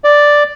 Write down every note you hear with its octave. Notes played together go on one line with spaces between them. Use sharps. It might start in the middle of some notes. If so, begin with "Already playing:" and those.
D5